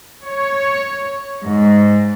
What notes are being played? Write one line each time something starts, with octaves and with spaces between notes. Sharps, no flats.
C#5
G#2